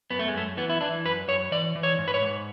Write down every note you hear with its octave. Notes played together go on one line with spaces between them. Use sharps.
F#2 B3
A3
G#3
F#2 A3
E3 B3
E4
E3 D4
F#2 B4
F#2 C#5
E3 D5
E3
C#5
G#2
B4
C#5
G#2